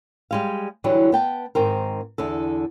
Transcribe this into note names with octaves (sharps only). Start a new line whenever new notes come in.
G3 G#3 F5
D3 E3 F#3 G3
B3 G5 A5
G#2 D#3 C4 A#4
E2 D3 A4